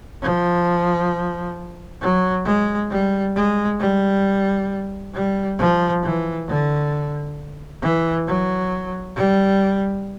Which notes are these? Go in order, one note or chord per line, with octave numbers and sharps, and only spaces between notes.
F3
F#3
G#3
G3
G#3
G3
G3
F3
E3
D3
E3
F#3
G3